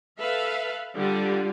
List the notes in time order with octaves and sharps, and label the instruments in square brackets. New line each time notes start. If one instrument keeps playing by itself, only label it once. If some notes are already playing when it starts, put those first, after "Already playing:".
[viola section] A4 B4 E5 F5
D3 G3 F4